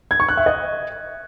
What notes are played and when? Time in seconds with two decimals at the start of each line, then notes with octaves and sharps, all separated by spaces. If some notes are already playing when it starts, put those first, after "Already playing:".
0.11 G#6
0.20 C#6
0.29 F#6
0.37 E5
0.46 D#5